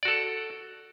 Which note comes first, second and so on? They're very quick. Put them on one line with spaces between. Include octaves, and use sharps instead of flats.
D5 F#4 A4